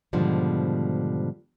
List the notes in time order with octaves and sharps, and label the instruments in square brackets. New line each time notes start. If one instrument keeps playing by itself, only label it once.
[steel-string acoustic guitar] G#2 B2 D3 D#3 F3 G3